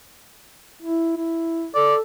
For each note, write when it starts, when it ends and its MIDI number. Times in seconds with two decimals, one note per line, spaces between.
0.82 1.15 64
1.17 1.68 64
1.75 2.01 69
1.75 1.95 74